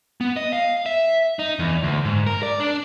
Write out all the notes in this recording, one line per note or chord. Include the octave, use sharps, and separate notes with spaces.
B3
D#5
F5
E5
D#4
E2
D2
G#2
A#4
D5
D4